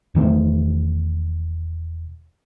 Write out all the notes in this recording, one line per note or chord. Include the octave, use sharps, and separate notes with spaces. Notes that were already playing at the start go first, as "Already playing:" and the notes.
E1 D#3 A3 C4